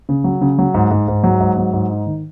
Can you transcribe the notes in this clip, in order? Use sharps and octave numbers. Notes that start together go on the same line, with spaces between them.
C#3
F#3
C#3
F#3
G#2
G#2
G#2
F#3
G#2
F#3
G#2
D#4
D#3